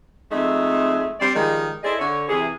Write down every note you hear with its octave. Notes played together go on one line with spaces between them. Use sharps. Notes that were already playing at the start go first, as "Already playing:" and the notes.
F2 G#3 A3 D#4 E5
G3 C4 C5 D5
D#3 F3 G3 G#3
E4 G#4 A4 C5 D5 D#5
D3 C#5
C3 E3 G#4